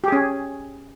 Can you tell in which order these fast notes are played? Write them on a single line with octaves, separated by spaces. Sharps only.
G4 G#4 C#4